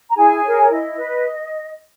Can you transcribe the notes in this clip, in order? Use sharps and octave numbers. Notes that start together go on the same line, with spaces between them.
A#5
E4 G#4 G#5
A#4 C#5
E4 D#5
B4